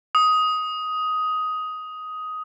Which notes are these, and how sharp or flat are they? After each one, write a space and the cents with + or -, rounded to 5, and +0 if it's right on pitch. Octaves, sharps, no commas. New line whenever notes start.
D#6 +10